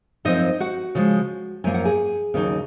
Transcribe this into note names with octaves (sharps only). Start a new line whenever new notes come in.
F#2 F3 C4 D#4 D#5
F#4 F#5
C#3 F3 G#3
F#2 F3 A#3 G#5
F#5
G#4 G#5
D#2 C#3 F#3 C4 D#4